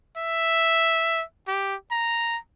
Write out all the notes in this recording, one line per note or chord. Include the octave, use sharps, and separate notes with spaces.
E5
G4
A#5